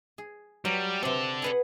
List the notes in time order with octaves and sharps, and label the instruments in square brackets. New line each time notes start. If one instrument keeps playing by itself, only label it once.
[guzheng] G#4
[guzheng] F#3 [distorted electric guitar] G3
[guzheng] C3 C4 [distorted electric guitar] A4 D5
[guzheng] G#4 B4 F#5